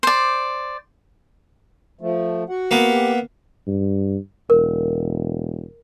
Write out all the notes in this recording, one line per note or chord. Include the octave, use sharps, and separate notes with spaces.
C5 D5
F3 A3
F#4 F#5
A#3 B3
G4
G2
E1 A#4